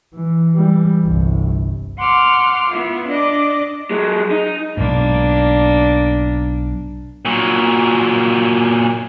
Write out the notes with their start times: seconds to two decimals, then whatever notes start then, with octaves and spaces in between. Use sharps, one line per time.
0.15 E3
0.56 E3 G3
1.03 G1 C2
1.98 F#5 C6 D6 F6
2.69 B3 E4 F4
3.07 D4 D5 D#5 D6
3.91 F#3 G#3
4.31 D#4
4.77 B1 G#2 A#3 D4
7.25 A#2 F#3